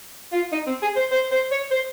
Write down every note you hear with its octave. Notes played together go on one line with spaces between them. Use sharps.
F4
D#4
C4
G#4
C5
C5
C5
C#5
C5